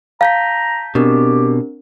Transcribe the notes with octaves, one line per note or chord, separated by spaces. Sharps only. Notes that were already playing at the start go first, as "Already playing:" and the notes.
F5 A5 A#5 G6 B6
B2 C4 D4 G4 A#4